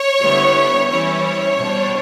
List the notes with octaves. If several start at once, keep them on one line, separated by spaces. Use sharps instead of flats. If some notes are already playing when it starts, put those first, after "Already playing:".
Already playing: C#5
D3 G3 B3 E4
E3 G3 C#4 E4 C#5
B2 G3 D4